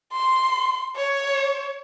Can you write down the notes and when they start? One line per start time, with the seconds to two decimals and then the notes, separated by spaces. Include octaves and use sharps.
0.12 C6
0.96 C#5